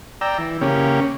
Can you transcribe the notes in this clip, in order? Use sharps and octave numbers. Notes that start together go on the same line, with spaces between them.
D5 G5 A#5 E6
E3
C#3 A#3 C#4 G4